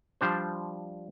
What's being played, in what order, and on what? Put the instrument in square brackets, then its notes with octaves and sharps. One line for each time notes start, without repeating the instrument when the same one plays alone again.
[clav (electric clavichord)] F3 G3 D4 C5